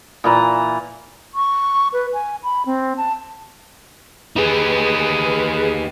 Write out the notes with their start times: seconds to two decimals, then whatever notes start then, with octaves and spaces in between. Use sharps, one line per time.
0.24 A#2 E3 A#5
1.35 C#6
1.93 B4
2.13 G#5
2.43 B5
2.66 C4
2.97 A5
4.36 D#4 G4 G#4 B4